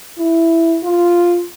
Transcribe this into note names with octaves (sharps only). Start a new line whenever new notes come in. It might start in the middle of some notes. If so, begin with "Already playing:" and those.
E4
F4